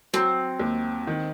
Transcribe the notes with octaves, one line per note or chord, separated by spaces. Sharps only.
F#3 C4
D#2
D#3